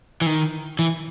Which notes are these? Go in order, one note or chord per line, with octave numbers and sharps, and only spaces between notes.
E3
D#3
E3